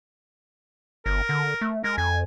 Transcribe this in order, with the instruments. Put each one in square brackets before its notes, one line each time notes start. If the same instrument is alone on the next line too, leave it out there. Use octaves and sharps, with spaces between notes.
[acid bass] G1 [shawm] A#4
[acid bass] D3
A3
[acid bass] G#3 [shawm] A#4
[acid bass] F2 [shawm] G#5